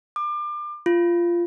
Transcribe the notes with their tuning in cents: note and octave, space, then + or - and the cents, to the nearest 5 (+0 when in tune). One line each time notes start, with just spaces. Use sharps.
D6 +30
F4 -15